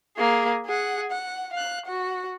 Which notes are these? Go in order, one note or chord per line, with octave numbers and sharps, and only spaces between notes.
A#3 G#4
G#4 F#5
F#5
F5 F#6
F#4 F#5